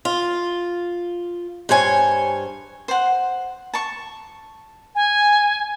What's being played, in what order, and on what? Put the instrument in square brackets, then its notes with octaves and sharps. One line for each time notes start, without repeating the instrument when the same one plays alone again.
[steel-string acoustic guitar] F4
G2 C5 C#5 G#5
[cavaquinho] C5 F#5
A5 C#6
[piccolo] G#5